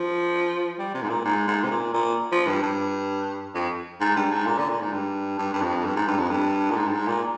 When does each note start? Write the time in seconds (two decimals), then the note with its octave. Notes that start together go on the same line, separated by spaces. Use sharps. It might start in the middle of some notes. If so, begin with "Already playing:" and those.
Already playing: F3
0.79 G3
0.94 C3
1.02 G#2
1.09 A#2
1.25 G#2
1.48 G#2
1.63 C3
1.71 A#2
1.94 A#2
2.32 F3
2.48 G2
2.63 G2
3.55 F2
4.01 G#2
4.16 G2
4.31 G#2
4.46 A#2
4.58 D3
4.69 A#2
4.81 G#2
4.93 G2
5.38 G2
5.53 G2
5.62 F2
5.85 G2
5.96 G#2
6.07 G2
6.19 F2
6.31 G2
6.71 A#2
6.77 G#2
6.87 G2
6.92 G#2
7.07 A#2